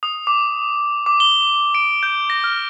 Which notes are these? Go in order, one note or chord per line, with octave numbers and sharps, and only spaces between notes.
D#6
D6
D6
G7
D7
G6
A#6
F6